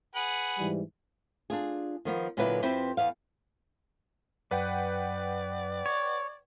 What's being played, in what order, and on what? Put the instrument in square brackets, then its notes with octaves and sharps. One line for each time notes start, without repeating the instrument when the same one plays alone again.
[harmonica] G#4 B4 F#5
[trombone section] G#2 E3 G3
[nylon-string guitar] D4 F4 G#4
D#3 F3 B3
A#2 D3 F#3 B3 E4 B4
F2 C4 E4 G4 B4 C5
E2 B3 F5
[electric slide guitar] F#2 [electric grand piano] B4 F#5 G5 [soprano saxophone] D5
[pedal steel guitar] C#5